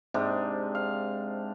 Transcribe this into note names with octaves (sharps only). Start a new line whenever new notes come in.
G#2 C3 D4
F5